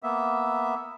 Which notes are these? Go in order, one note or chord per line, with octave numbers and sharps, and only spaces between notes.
A#3 B3 E5